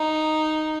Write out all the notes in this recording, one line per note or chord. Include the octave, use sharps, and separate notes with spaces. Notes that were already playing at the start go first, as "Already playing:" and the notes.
Already playing: D#4